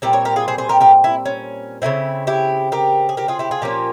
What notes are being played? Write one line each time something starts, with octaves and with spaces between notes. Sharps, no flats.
A#2 G3 C4 G4 A#4
A#4 C#5
G4 A#4
F4 G#4
G#4 C5
G#4 C5
G4 A#4
G4 A#4
E4
C#4
C#3 F3 C4 E4
E4 G4
G4 A#4
G#4
G4 A#4
F4 G#4
E4 G4
F4 G#4
A#2 F3 A#3 C#4 G4 A#4